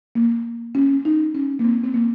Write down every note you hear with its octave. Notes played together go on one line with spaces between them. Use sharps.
A#3
C#4
D#4
C#4
A#3
C4
C4
A#3